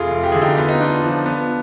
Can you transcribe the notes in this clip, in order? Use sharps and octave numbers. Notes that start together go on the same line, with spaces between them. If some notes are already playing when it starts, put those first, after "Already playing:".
Already playing: F1 F4 G#4
F1
G4
D3 G#4
D#4 G4
B3 F4
D#4
B3 D4 F4
F3
B3